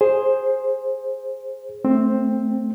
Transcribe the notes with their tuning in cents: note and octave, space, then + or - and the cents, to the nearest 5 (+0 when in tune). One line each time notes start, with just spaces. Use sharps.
G#4 +0 C5 +10
A3 -5 C4 +5